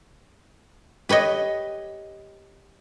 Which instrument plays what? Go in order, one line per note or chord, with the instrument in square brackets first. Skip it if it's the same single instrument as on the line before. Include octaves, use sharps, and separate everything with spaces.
[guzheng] G4 B4 C#5 D#5